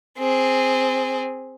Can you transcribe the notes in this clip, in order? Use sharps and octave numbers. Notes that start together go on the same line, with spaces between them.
C4 G#4